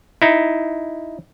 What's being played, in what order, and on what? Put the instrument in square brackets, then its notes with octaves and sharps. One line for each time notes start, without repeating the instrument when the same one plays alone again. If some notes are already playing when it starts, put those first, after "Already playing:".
[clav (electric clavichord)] D#4 E4